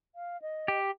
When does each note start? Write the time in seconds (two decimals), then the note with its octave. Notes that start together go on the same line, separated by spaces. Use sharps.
0.15 F5
0.42 D#5
0.68 G4